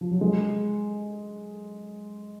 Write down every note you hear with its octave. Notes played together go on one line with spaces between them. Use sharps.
F3
F#3
G#3